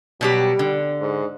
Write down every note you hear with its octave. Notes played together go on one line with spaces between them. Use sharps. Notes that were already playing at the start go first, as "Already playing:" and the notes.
B2 F#3 G3 G4
D3
G#2